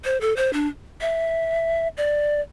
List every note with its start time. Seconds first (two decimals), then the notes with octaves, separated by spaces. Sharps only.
0.05 C5
0.21 A4
0.37 C5
0.53 D4
1.01 E5
1.97 D5